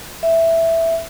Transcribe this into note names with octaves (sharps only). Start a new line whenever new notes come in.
E5